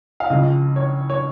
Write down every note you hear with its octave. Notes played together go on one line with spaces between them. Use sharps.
F5
C#2 C#3 F3 D#5
C#5
C#5